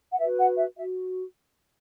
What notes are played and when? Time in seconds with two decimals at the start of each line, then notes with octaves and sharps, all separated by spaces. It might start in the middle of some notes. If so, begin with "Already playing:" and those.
0.12 F#5
0.18 F#4 B4 E5
0.38 F#5
0.57 E5
0.77 F#4 E5